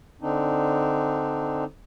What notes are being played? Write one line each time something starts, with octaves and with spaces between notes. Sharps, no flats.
D3 C4 D4 D#4